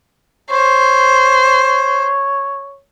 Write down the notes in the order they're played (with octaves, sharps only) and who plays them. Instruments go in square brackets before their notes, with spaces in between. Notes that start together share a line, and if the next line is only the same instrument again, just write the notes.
[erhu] C5 [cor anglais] C#5